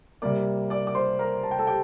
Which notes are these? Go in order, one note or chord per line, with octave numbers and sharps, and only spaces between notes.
C3 G3 A#3 D5 D6
D5 D6
D6
C5 C6
A#4 A#5
A5
G5
A4 A5
G4 G5